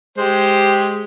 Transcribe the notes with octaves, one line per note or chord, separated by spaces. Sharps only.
G#3 G4 C5